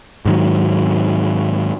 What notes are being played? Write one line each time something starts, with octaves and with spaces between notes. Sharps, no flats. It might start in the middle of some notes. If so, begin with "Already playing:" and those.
G#2 D#3 F#3